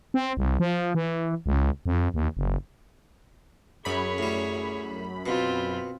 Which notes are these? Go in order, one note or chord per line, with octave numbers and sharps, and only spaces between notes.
C4
C2
F3
E3
C#2
F2
D#2
F#1
F#2 G#4 C#5 B5
A2 G3
B2 C4 F4